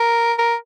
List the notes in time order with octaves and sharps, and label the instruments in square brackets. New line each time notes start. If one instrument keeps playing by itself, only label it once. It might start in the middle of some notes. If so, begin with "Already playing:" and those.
Already playing: [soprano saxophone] A#4
A#4